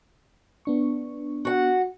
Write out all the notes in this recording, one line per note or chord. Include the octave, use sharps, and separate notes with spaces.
B3 D4 C#6
F#4 F#5